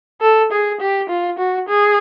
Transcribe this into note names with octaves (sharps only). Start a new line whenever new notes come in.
A4
G#4
G4
F4
F#4
G#4